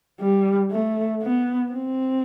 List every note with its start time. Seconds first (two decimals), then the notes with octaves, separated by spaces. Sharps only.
0.20 G3
0.71 A3
1.22 B3
1.72 C4